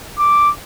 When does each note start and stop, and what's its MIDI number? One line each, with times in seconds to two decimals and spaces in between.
0.19 0.50 86